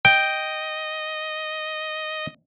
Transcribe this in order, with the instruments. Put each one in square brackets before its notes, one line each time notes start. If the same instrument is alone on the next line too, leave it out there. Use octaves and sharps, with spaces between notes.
[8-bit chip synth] D#5 [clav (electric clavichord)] G5